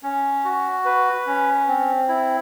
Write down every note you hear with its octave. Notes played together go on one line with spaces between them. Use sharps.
C#4
F#4
B4
C#4
C4
E4